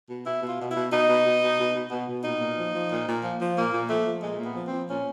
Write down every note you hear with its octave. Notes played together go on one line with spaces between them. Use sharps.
B2
B2 E4
B2
F4
B2
E4
B2
B2 D#4
B2
B2
B2
B2
B2
B2
B2
A#2 D#4
A#2
F3
F3
A#2
A#2
F3
F3
A#2 A#3
A#2
F3 A3
F3
A#2 G#3
A#2
B3
F3
C4
F3
A#2 C#4